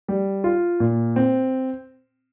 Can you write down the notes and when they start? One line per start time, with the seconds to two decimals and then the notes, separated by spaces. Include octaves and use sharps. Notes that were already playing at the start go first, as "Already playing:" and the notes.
0.08 G3
0.44 F4
0.80 A#2
1.16 C4